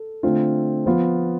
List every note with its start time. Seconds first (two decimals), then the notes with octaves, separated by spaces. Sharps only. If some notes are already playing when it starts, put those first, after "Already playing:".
Already playing: A4
0.23 D3 A3 C4 F4
0.86 F3 B3 F4